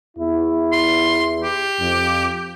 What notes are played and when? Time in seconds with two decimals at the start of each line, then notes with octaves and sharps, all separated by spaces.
0.18 E2 E4
0.72 C6
1.43 G4
1.80 F2